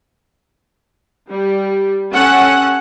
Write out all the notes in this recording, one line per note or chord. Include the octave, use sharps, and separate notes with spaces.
G3
C#4 A4 F#5